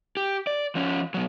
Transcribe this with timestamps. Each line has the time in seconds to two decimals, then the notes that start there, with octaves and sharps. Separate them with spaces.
0.17 G4
0.47 D5
0.75 F3 C#4
1.14 B2 F#3